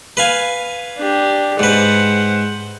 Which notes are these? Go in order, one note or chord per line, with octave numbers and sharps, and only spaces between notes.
B4 F5 G#5
D4 G4
G#2 B4 C5 F#5